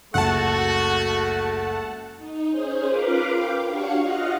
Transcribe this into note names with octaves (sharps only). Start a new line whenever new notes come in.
F#1 C#2 A3 F#4 F#5 A5
D#4
C#4 G#4 C5
F4 A#4 B4 F5 B5 D6
F5 G5 D6
D4 F#4 G4 C#5 F5 C#6
F4 D#5 F5 F#5